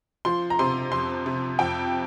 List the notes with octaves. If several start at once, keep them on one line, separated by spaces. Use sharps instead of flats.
F3 C6
A#5
C3 C6
F2 C6
C3
F2 G5